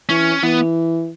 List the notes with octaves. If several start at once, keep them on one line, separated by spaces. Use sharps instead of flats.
E3 C#4
E3 B3